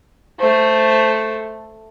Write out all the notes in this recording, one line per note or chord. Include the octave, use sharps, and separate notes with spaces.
A3 C5